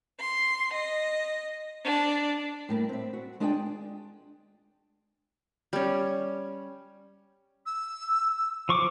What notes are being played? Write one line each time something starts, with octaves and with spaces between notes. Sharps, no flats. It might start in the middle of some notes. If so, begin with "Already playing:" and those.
C6
D#5
D4
A2 G3 A#3
C4 E5
F#4
G#3 D4 F4 G#4 D5 G5
G3 C#4
E6
F3 C#6 D6